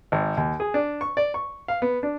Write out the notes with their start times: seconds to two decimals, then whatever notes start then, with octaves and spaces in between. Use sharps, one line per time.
0.12 G#1
0.37 D#2
0.60 G#4
0.74 D4
1.01 C#6
1.17 D5
1.34 C#6
1.68 F5
1.82 B3
2.03 D4